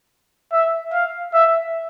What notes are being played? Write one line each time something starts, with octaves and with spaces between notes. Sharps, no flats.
E5
F5
E5